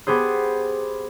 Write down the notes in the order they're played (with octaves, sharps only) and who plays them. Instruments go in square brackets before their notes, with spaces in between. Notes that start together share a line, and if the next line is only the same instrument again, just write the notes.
[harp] B3 G4 G#4 C5